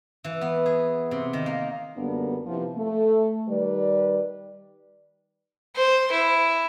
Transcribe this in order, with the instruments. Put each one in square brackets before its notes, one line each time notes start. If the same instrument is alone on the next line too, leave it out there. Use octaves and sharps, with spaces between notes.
[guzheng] E3
B3
G#4
C3
D#3
A#3
[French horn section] F#2 D3 G3 A#3 B3 D4
C3 F3 B3 E4 F4
A3
D#3 G3 B4 D5
[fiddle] C5
E4